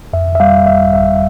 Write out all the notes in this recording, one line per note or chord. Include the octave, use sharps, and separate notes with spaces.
F2 E5
E5
G3 F5
G1 E5
G1 E5